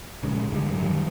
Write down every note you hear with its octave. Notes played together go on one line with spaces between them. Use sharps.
A#1 C#3 G#3
G#2 D3 D#3 G3
F#2
D#3 F#3 G3